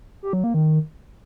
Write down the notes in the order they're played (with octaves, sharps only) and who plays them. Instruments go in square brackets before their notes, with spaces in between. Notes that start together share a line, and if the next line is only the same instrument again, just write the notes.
[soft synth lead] G4
F#3
A#3
D#3